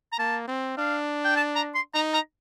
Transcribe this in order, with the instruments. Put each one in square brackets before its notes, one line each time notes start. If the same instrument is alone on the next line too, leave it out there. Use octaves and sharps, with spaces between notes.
[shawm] A#5
[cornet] A#3 [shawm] A5
[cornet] C4
[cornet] D4 [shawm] F5
[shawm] G5
A5
A#5
C6
[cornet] D#4 [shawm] A#5
[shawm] A#5